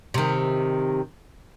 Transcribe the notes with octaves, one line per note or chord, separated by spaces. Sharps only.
C3 D#3